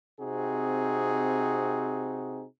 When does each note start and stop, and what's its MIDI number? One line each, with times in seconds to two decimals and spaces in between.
0.20 2.44 48
0.20 2.44 60
0.20 2.44 63
0.20 2.44 66
0.20 2.44 68